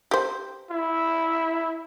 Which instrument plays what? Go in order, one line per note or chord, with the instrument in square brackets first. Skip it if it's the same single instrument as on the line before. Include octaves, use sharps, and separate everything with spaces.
[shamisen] G4 C5
[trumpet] E4